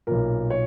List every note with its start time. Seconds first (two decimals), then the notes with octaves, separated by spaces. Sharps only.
0.07 B1 A#2 A#4
0.50 C#5